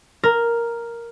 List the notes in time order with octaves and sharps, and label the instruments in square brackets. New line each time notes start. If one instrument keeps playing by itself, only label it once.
[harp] A#4